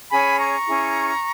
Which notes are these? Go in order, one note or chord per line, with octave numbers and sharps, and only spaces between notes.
C#4 G#4 C#5 G#5 B5
A#5 C#6
C#4 E4 G#4